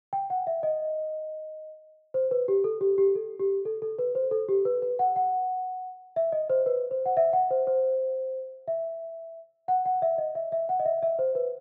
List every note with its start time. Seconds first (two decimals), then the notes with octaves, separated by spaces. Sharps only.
0.13 G5
0.30 F#5
0.47 E5
0.63 D#5
2.14 C5
2.31 B4
2.48 G4
2.64 A4
2.81 G4
2.98 G4
3.15 A4
3.40 G4
3.65 A4
3.82 A4
3.99 B4
4.15 C5
4.31 A4
4.48 G4
4.65 B4
4.82 B4
4.99 F#5
5.16 F#5
6.16 E5
6.32 D#5
6.50 C5
6.66 B4
6.91 C5
7.06 F#5
7.17 E5
7.33 F#5
7.51 C5
7.67 C5
8.68 E5
9.68 F#5
9.85 F#5
10.02 E5
10.18 D#5
10.35 E5
10.52 E5
10.69 F#5
10.80 D#5
10.86 E5
11.03 E5
11.19 C5
11.35 B4